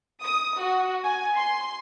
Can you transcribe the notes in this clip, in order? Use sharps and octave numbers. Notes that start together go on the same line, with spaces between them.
D#6
F#4
G#5
C6